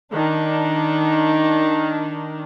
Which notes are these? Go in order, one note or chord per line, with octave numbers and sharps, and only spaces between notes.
D#3 D4